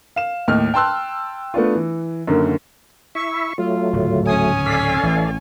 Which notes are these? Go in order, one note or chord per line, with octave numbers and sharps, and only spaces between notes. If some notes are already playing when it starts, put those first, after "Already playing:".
F5 E7
D#2 A2 D#4 F6
G5 A5 C6 E6 F#6
A3 B3 D4 F4
E3
F#2 D3 D#3 A#3
E4 E5 C#6
F#3 A3 F4
D1 G#2 C#3
C#4 G#5 D#6
A4 D5 F5 B6
A1 E3